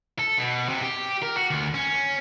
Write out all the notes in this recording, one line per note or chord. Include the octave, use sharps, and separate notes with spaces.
A4
B2
C3
G4
A#4
F#4
D2
C#4